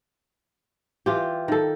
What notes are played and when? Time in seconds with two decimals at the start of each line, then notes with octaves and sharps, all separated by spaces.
1.06 E3 F4 G4
1.48 D#3 A4